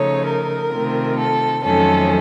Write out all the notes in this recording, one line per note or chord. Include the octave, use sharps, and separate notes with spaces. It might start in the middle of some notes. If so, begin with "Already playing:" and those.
Already playing: C#3 F3 A3 D#4 C#5
A#4
C3 D#3 A3 C4 F4
A4
F2 D#3 F#3 A3 C#4 A4